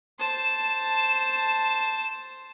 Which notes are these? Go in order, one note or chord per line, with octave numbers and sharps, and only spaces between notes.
C5 A5